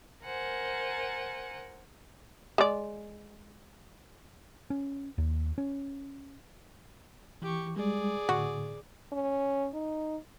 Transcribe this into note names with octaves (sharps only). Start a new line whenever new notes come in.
A#4 C5 F#5 G#5
G#3 D5
C#4
D#2
C#4
E3 G4 C#6
G3 G#3 G#4 D5
A2 D3 F#4
C#4
D#4